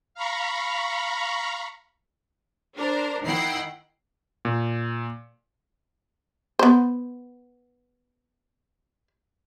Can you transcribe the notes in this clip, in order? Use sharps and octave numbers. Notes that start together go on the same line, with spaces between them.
F5 A#5 B5 C#6
D4 A#4 C5
D#3 E4 F#5 G5 C7
A#2
B3 C5